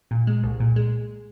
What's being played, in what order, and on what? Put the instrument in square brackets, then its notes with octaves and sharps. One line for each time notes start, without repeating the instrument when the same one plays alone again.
[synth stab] A#2
G#3
C2
A#2
G#3